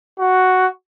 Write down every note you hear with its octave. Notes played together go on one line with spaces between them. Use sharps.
F#4